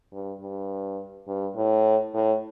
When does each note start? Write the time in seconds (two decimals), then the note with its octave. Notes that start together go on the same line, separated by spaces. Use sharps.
0.12 G2
0.40 G2
1.27 G2
1.56 A2
2.14 A2